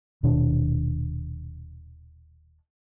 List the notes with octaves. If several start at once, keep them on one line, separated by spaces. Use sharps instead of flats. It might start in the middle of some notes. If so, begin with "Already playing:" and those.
D#1 B2 D#3 D4